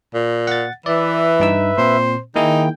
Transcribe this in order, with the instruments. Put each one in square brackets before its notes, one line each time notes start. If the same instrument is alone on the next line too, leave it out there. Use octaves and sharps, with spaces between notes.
[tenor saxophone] A#2
[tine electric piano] F#5 A6
[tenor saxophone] E3 [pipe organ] B4 E5 [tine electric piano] D5
[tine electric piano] G2 D#4 E6
[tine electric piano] A#2 C4 [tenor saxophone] C5
[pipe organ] D#3 G5 [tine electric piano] A#3 E4 G#4 [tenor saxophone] D#4